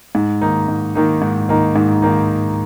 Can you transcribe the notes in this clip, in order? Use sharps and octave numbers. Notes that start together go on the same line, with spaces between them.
G#2
D#3 A#3 D#4
G#2
D#3 A#3 D#4
G#2
D#3 A#3 D#4
G#2
D#3 A#3 D#4